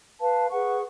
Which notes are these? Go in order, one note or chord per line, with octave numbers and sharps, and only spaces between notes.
B4 F5 A5
G#4 B4 F#5 C#6